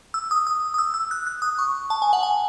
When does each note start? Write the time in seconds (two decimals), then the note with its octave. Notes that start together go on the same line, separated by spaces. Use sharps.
0.14 E6
0.31 D#6
0.47 D#6
0.74 D#6
0.78 E6
0.94 E6
1.11 F#6
1.27 F#6
1.42 D#6
1.58 C#6
1.90 A5
2.02 G#5
2.13 F#5
2.23 G#5